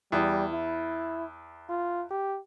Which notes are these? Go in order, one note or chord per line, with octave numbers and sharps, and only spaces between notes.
E2 G3
E4
F4
G4